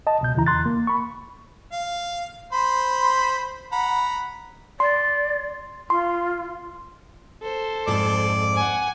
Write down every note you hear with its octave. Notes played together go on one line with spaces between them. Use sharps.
D#5 A5
C#2 B2 G6
D#2 C#3 E3 E4 A#5
E2 C6 F#6 A6
A#3
B5 C#6
F5
C5 B5 C6
F#5 A#5 B5
D5 C6
F4 C6
A4 C5
F2 G#2 D5
F#5 G#5